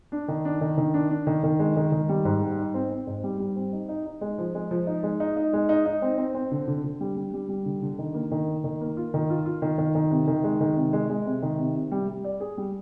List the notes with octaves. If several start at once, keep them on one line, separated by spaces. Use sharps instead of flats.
D4
D#3
D4
D#3
D#3
D4
D4
D#3
D#3
G#3
D#3
D#3
G3
G#2
G3
D#4
C4
C4
G#2
G3
G3
C4
D#4
D#4
D#4
G#3
F3
G#3
F3
D#4
G#3
D#4
D#4
G#3
D#4
D#4
C4
C4
C4
D3
D3
D3
G3
G3
G3
G3
D3
D3
D#3
A#3
D#3
A#3
D#3
A#3
F4
D#3
F4
F4
D#3
D#3
D#3
C3
D#3
G#3
D#3
C3
G#3
G#3
C3
D#3
C3
C3
G3
G3
D5
G#4
G3